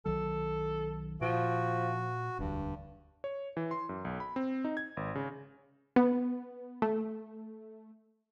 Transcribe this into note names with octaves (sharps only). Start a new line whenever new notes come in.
B1 D#3 F#3 A4
A#2 F3 F#4
E1 D2 G2
C#5
E3
C6
F#2
B1
B5
C4
D#4
G#6
G#1
C#3
B3
A3